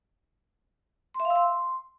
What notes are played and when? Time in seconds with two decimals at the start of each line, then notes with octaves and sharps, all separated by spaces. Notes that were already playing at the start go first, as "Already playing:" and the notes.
1.14 C6
1.20 E5
1.25 F5
1.30 E6
1.36 C6